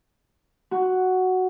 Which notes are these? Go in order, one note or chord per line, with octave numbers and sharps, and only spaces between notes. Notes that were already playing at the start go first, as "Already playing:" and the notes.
F#4